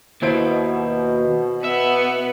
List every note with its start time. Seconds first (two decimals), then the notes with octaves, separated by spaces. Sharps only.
0.22 D#2 B2 E4 C5 D7
1.64 B3 E5